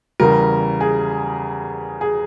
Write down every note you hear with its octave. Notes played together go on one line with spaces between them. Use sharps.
E2 C#3 G3 A#4
G#4
G#4